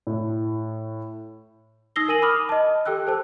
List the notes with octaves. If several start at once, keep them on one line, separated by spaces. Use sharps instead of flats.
A2
D#4 D#6 E6 A#6 C7 G7
A#4 G#5 D#7 F#7
B5 D6 D#6 F6
D#5 A5
G4 A4 G5 E6 F#6
A4 C5 A5